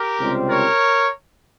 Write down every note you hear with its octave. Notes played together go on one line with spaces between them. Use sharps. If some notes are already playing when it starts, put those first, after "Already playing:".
Already playing: G4 A#4
C#2 C3 G3 C4
A#4 C#5